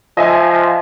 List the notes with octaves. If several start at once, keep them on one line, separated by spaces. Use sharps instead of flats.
F3 D#5 E5 G#5